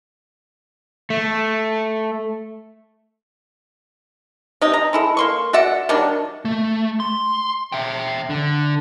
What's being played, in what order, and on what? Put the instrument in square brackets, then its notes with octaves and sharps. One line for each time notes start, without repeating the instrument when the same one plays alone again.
[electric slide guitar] A3
[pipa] C3 D#4
A#5
G#3 E4 A4
A#3 C6 C#6
F#4 D5 E5 F#5
D#3 F#3 G3 D4
[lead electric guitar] A3
C6
E5 G5
D3